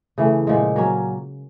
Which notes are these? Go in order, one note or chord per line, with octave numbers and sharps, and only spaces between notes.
C#3 E3 A3
A#2 F3 G#3
F#3 A#3 C#4